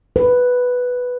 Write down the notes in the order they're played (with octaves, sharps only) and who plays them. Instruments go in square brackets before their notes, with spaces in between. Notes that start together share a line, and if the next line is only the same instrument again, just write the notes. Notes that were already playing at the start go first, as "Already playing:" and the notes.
[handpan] B4